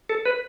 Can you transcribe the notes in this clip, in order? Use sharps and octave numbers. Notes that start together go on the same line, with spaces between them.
A4
B4